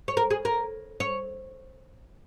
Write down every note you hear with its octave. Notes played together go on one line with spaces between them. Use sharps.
C#5
A#4
G#4
A#4
C#5